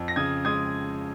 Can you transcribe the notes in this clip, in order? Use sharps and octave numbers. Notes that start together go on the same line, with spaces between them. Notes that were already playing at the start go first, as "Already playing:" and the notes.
Already playing: F2
A#6
C#3 D#6 G#6
G#3 D#6 G#6